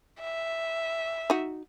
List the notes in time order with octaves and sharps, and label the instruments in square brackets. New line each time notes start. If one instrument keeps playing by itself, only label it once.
[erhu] E5
[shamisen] D#4 F#4